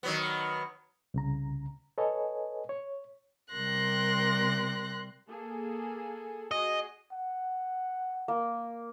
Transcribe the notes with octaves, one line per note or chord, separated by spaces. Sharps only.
D#3 F#3 B3
C2 C#3 A#5
A4 B4 C#5 D#5 G#5
C#5
C3 G3 A#4 C6 F#6 A#6
A#3 G#4 A4
F#4 G#4 D#5
F#5
A#3